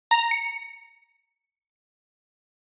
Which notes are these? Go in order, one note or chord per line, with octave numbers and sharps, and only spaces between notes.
A#5
C#7